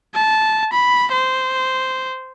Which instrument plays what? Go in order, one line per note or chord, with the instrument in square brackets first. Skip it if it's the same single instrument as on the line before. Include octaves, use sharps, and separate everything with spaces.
[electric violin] A5
B5
C5